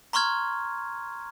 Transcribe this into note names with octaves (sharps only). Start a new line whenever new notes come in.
A#5 C6 C#6 F6 G#6